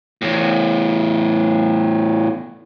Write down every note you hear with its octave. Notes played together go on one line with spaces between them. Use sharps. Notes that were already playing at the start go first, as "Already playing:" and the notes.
E2 A2